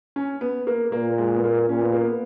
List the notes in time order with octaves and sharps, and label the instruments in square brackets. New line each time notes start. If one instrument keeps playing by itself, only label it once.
[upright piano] C#4
B3
A#3
[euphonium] A#2 [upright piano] A#3
[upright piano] G#3
B3
A#3
[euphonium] A#2 [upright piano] C#4
[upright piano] B3
A#3
B3